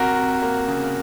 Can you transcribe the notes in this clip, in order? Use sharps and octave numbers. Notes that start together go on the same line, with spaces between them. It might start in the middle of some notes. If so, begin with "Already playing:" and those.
Already playing: C3 F#4 A#4
C3
A#3
C#3